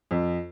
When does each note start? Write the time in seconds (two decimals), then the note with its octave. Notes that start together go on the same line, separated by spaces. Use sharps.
0.11 F2